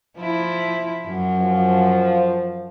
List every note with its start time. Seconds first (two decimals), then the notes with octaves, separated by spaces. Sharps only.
0.17 F3 E4
1.06 F#2
1.40 F3